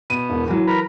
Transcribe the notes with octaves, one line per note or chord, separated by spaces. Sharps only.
B2 D#7
E1
E3 F#3
A#4 B4